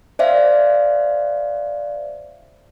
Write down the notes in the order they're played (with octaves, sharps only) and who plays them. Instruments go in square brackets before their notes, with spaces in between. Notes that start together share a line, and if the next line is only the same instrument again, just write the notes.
[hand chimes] C5 D5 E5 F5